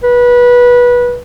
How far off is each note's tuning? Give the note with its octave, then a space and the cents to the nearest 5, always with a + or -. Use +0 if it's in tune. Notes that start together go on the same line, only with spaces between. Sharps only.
B4 -20